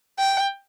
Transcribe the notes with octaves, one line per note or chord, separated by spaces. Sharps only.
G5